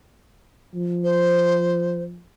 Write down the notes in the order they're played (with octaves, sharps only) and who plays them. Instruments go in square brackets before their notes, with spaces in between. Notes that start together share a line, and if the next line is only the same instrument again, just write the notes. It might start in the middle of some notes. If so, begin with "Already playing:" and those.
[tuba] F3
[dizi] C5